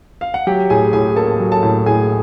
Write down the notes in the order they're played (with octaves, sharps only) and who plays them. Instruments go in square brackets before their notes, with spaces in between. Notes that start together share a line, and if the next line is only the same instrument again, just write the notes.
[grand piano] F5
F#5
F#3 G4 G5
A2 G#4 G#5
A2 G#4 G#5
A#3 A4 A5
F#3
A4 A5
A2
A2 G#4 G#5